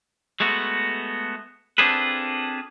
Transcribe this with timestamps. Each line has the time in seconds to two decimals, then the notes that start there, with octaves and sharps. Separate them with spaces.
0.40 G#3 A3 B3 F#4
1.78 C4 D4 F4 G#4 A4 B4